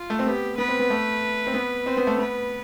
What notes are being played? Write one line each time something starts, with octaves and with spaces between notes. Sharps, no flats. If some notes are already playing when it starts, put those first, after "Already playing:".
Already playing: F4
A3
C4
B3 G4
B3 B4
C4
B3
A3
C4
B3
C4 C5
B3
A3
B3 B4